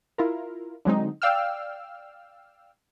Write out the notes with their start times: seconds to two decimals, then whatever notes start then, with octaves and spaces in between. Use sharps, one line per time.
0.18 E4 F4 A#4
0.85 D3 F#3 G#3 C4 D#4
1.22 D5 F5 G5 E6 F6